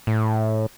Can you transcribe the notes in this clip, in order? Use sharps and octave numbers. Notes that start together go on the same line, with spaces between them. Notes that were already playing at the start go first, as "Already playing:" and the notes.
A2